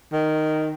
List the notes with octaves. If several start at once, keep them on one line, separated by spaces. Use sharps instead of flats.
D#3